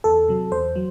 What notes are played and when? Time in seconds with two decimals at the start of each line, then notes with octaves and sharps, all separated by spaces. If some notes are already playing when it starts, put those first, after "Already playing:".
0.04 E2 A4
0.28 C3 F#3
0.52 E2 C5
0.76 F#3